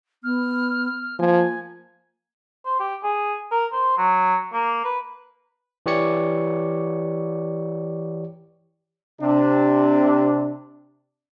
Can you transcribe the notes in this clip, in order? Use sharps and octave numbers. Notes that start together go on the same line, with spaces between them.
B3 F6
F3 A#3 G#5
C5
G4
G#4
A#4
C5
F#3
A#3
B4
E3 G4 C#5 D5 C#7
C3 D4